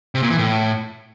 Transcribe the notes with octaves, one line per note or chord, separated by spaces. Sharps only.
C3
A#2
E3
A2